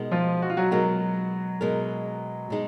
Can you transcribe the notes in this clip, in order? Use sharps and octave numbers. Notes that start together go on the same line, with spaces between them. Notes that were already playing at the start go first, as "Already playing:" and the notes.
Already playing: B2 G#3 D#4 A#4
F3 F4
F#4
F4
F#3 F#4
B2 F#3 G#3 D#4 F#4 A#4
B2 G#3 D#4 A#4
B2 G#3 D#4